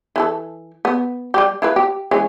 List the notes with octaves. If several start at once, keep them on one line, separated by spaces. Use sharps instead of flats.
E3 E4 A4
B3
G3 G4
E4 F4 B4
G4
E3 G#3 C#4